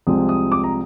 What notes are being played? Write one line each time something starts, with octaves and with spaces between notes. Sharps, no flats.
C2 C3 F3 G#3 D#6
D#6
D6
A#5